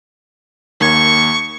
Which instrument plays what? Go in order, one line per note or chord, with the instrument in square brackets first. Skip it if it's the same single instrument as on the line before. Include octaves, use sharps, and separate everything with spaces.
[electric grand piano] D#2 A#3 G#6 [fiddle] C#6